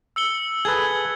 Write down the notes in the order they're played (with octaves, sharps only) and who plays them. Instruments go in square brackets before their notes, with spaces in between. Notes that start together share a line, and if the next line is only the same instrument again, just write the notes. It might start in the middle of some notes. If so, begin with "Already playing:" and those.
[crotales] E6 C#7 G7
[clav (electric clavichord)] G#4 A4 B4 [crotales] G#6